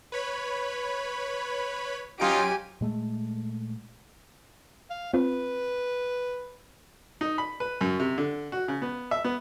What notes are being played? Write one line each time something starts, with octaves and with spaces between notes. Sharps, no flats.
B4 C#5 B5
F#3 C#4 D#4 F4 G4 G#5 D7
A#2 G#3 A3
F5
C4 F4 B4
D#4
B5
B4
F#2
C3
D3
F#4
C#3
B3
E5
B3